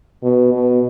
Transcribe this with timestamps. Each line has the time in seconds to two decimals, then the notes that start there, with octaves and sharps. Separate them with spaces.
0.23 B2
0.53 B2